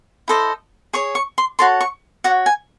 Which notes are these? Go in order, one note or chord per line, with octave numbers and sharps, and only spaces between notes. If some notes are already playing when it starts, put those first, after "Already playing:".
E4 A4 C5 D#5
G#4 C#5 C#6
C#6
C6
F#4 A4 C#5 C6
C#6
F#4 C#5 F#5
G#5